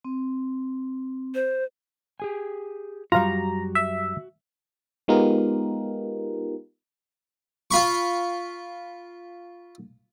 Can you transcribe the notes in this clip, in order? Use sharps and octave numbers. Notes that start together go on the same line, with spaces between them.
C4
C5
G4 G#4 G#5
F#2 G3 F4 F#4 F5 A#5
E5
G#3 B3 D#4 F4 G4 A#4
F4 B5 C#6